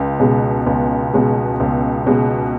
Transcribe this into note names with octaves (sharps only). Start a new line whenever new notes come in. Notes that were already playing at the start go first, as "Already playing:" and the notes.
Already playing: C#2
B2 G#3
C#2
B2 G#3
C#2
B2 G#3